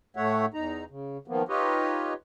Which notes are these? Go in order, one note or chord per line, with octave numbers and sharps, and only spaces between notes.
A2 A3 C#5 E5 F#5
E2 D#4 A#5
C#3
D#3 F3 A#3 B3
D#4 F4 G4 B4 C#5 D#5